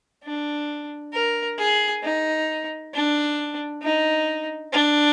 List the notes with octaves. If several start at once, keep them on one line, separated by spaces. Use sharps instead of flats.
D4
A#4
G#4
D#4
D4
D#4
D4